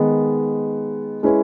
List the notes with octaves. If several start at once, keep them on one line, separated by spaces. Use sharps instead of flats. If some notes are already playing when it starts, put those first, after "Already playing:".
Already playing: D#3 G#3 B3
G#3 C#4 E4 B4